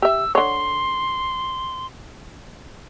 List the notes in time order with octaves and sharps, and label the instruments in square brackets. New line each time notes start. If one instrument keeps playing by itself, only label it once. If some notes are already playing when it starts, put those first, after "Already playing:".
[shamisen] G4 E5 [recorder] E6
[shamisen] D3 C#5 [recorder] C6